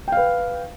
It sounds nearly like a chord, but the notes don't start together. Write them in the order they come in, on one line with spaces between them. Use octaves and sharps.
G5 F5 B4